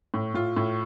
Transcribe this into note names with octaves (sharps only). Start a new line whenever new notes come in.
A2
A2 F4
A2